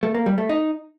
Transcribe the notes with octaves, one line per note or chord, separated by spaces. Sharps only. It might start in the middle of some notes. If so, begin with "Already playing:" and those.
A3
A#3
G3
A3
D#4